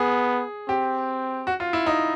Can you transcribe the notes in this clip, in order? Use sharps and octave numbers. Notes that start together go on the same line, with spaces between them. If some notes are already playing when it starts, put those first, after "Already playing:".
Already playing: B3 G#4
C4 G4
F#4
F4
E4
D#4